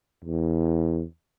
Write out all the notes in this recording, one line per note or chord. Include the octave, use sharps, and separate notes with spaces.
E2